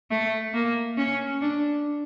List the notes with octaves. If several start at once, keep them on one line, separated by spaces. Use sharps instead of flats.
A3
A#3
C#4
D4